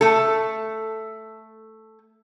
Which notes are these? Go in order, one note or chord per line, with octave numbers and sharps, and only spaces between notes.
A3 A4